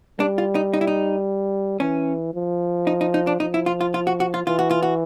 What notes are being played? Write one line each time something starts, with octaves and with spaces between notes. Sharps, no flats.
G3 D4
F4
D#4
D#4
E4
D#4
E3 C#4
F3
D#4
D#4
D#4
D4
F3 D#4
E4
F4
F4
F4
F#4
F#4
F4
E3 F4
F#4
F4
F#4